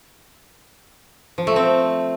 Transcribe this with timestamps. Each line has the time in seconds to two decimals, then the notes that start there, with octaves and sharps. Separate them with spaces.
1.38 F3
1.47 A3
1.56 C4